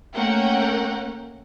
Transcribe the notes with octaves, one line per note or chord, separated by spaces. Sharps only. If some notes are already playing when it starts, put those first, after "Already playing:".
A3 A#3 C#4 A#4 F#5 G5